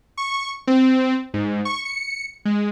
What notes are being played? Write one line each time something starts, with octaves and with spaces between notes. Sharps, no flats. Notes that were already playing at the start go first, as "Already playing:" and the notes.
C#6
C4
G#2
C#6
C#7
G#3